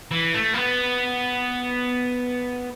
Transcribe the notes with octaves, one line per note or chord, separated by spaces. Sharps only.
E3
A3
A#3
B3